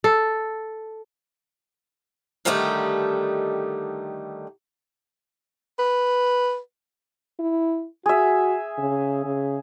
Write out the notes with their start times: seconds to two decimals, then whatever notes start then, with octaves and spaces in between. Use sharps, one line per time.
0.04 A4
2.45 D3 D#3 G3 A3 D#4 G4
5.79 B4
7.39 E4
8.06 F#4 G#4 E5
8.78 C#3
9.24 C#3